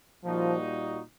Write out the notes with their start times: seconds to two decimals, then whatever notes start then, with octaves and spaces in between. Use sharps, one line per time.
0.24 A#2 F3 G3 A#3 D#4 F#4